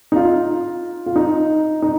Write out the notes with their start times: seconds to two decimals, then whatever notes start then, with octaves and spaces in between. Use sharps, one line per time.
0.12 D#4
0.16 F4
1.06 F4
1.16 D#4
1.82 D#4